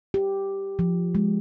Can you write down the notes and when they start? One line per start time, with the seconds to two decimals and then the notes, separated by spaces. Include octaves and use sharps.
0.14 G4
0.79 F3
1.15 G#3